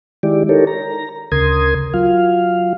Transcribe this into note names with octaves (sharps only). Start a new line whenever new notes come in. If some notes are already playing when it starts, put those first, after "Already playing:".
D#3 G#3 E4 G4 D5
D#4 G4 A4 A#4 C#5
A#5
D2 C#3 A#4 C6 D#6 G#6
F#3 F4 F5